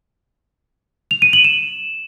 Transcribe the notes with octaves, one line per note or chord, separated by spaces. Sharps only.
F7
D#7
F#7
E7